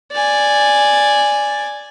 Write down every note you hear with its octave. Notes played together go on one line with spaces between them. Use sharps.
D5 G#5